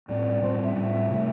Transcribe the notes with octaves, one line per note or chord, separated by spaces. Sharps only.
A2 G3 C4 D5
A2 G3 C4 C5
E5
A2 G3 C4
C3 A3